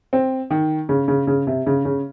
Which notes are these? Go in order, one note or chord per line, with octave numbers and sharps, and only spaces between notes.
C4
D#3
C#3
C#3
C#3
C3
C#3
C#3